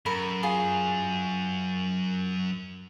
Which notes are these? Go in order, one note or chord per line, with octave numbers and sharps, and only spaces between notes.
F#2 A#4 B5
F4 G#4